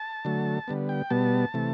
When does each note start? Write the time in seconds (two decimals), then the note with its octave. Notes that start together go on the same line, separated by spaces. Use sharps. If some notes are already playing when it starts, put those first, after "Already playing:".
Already playing: A5
0.25 D3 F#3 A3
0.68 D3 G3 B3
0.89 G5
1.10 B2 G3 B3 A5
1.54 C3 E3 A3